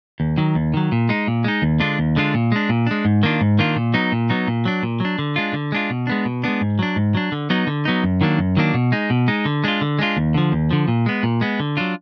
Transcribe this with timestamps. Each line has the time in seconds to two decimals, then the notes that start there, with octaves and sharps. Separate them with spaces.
0.20 D#2
0.38 D#3 F#3
0.55 D#2
0.74 D#3 F#3
0.92 A#2
1.09 G#3 D#4
1.27 A#2
1.44 G#3 D#4
1.62 D#2
1.80 D3 G#3 D4 F4
1.99 D#2
2.16 D3 G#3 D4 F4
2.34 A#2
2.52 G#3 D4
2.69 A#2
2.87 G#3 D4
3.05 G#2
3.23 D#3 A#3 D4 F4
3.41 G#2
3.59 D#3 A#3 D4 F4
3.76 A#2
3.94 F#3 B3 D#4
4.12 A#2
4.30 F#3 B3 D#4
4.47 A#2
4.65 F#3 D4
4.83 A#2
5.00 F#3 D4
5.19 D3
5.36 G#3 D4 F4
5.53 D3
5.72 G#3 D4 F4
5.90 B2
6.07 G#3 B3 D4
6.25 B2
6.44 G#3 B3 D4
6.61 G#2
6.79 F#3 D4
6.96 G#2
7.15 F#3 D4
7.32 D3
7.50 F#3 B3 D#4
7.67 D3
7.85 F#3 B3 D#4
8.04 F#2
8.21 D#3 F#3 A#3 D4
8.38 F#2
8.57 D#3 F#3 A#3 D4
8.74 B2
8.92 G#3 D#4
9.10 B2
9.28 G#3 D#4
9.45 D3
9.64 G#3 D4 F4
9.81 D3
9.99 G#3 D4 F4
10.17 D#2
10.34 D3 F3
10.52 D#2
10.71 D3 F3
10.88 A#2
11.06 G#3 B3
11.23 A#2
11.41 G#3 B3
11.60 D3
11.77 F#3 D4 F4